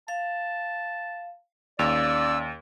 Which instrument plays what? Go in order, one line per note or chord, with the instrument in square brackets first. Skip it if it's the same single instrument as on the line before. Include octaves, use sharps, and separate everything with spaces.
[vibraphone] F5 [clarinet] A5
[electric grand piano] D#2 [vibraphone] C#4 F5 D6 [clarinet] D5 [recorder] E6